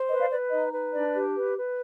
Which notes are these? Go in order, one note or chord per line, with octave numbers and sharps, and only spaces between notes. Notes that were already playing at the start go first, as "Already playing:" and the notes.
Already playing: C5
B4 D#5
D5 F5
B4 D5
D#4 D#5
B4
D4 D5
G4
B4
B4